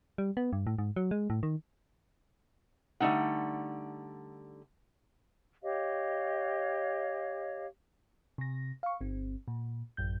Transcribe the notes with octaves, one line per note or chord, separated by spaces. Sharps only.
G3
B3
G2
A2
G#2
F#3
G#3
A2
D#3
D3 G3 A3 D#4 F#5
G4 C#5 D#5 F5
C3 A#6
F5 C#6
G1 C4
A#2
A1 F#2 G6